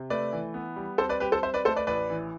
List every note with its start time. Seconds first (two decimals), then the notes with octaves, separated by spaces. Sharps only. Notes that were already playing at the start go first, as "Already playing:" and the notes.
Already playing: C3
0.10 A3 B4 D5
0.33 E3
0.54 B3
0.76 G3
0.98 C4 A4 C5
1.09 B4 D5
1.20 G3 G4 B4
1.32 A4 C5
1.43 C4 C5 E5
1.54 B4 D5
1.65 A3 A4 C5
1.76 B4 D5
1.87 A1 B4 D5
2.10 E3